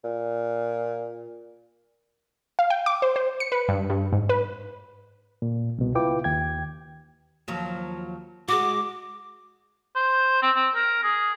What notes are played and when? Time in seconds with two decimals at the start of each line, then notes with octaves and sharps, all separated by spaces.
0.04 A#2
2.59 F5
2.70 G5
2.86 D6
3.02 C5
3.16 C5
3.40 C#7
3.52 B4
3.69 G2
3.90 G2
4.13 G#2
4.29 B4
5.42 A#2
5.78 C2 B2
5.95 C#2 E4 F4 B4 G5 D6
6.24 D#2 G5 G#6
7.48 D#2 F3 F#3
8.48 G#3 F#4 D6
9.96 C5
10.42 C4
10.56 C4
10.75 A#4
11.03 G#4